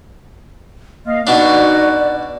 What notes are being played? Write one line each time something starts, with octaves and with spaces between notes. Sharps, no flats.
A#3 D#5 F5
B2 D4 D#4 F#4 D5